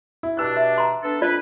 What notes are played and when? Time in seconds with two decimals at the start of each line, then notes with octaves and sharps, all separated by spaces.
0.23 E4
0.37 G2 B2 D4 A5 E6 F#6
0.57 E5
0.78 A#5 C6
1.03 B3 D4 A4
1.22 F2 D4 F4 B4 D5